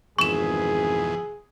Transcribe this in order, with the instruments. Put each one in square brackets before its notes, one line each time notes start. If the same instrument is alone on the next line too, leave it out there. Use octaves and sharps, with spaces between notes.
[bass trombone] G#1 [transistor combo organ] F2 B2 E3 [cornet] G#4 [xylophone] C#6 E7